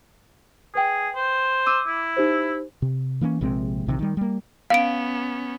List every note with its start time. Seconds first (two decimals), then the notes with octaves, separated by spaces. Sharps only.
0.75 G#4 B4 G5
1.15 C5
1.66 D6 E6 D#7
1.87 E4
2.17 D#4 G4 C5
2.82 C3
3.21 E3 A#3 C4 C#4
3.41 A#1 C3 G#3 C4
3.87 A#1 C3 D#3
3.99 D#3 G3
4.17 G3 A#3
4.70 B3 C#4 F5 D7